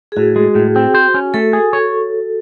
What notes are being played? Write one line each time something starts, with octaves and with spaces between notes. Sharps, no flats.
G#4
A2 F#4
G#3
A2
C4
C5
C#4
A3 A4
G#4
C#5